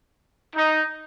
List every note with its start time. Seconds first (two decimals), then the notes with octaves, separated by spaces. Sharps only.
0.56 D#4